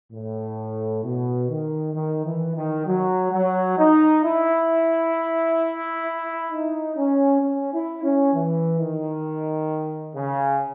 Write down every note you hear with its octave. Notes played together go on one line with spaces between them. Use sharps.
A2
B2
D#3
D#3
E3
D#3
F#3
F#3
D#4
E4
D#4
C#4
C#4
E4
C#4
E3
D#3
C#3